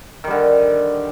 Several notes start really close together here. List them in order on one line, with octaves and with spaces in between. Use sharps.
D#3 G3 D3